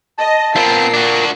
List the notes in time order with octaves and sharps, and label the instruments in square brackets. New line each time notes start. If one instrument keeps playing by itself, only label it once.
[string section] D#5 [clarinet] A5
[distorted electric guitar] B3 C4 [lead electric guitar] F4 A#4 [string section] C7
[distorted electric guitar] D4 F#4